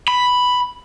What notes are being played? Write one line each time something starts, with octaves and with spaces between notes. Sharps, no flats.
B5